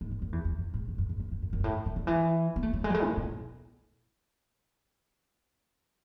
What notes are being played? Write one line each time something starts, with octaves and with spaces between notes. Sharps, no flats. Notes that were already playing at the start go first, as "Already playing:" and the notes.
G#2
F#2
F#2
E2
E2
F#2
G#2
F#2
F#2
F#2
F#2
F#2
F#2
F#2
G#2
A2
D3
D3
E3
B3
A3
F#3
G#3
F#3
G#3
A2
B2